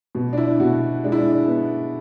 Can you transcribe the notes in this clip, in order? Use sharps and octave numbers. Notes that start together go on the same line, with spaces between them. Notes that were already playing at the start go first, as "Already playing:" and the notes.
B2
D4
E4
B2 F#4
G#3 D4
E4
D4
B3